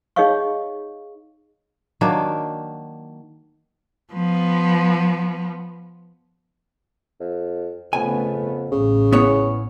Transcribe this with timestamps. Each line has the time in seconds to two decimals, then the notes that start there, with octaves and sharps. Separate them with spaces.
0.16 D#4 G#4 C#5 D#5 F5 C#6
2.01 D#3 F#3 A#3 D4
4.13 F3 B3
7.20 F2
7.93 F2 C#3 A3 B3 G#5
8.72 A1 C#3
9.12 B3 C#4 E4 C#5